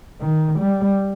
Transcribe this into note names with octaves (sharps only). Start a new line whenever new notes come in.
D#3
G3